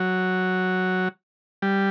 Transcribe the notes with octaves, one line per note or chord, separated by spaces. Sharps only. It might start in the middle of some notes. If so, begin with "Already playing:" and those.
Already playing: F#3
G3